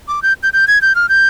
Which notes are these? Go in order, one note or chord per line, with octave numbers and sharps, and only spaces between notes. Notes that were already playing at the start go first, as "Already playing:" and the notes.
D6
G6
G6
G6
G#6
G6
F6
G6